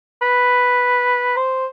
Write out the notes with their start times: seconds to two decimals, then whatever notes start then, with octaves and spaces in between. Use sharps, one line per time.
0.22 B4
1.37 C5